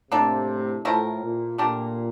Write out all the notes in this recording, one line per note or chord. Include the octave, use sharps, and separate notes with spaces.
A2 C3 A#3 D4 A4
A2 F3 A3 E4 A#4
A#2
A#2 A3 D4 G4 A#4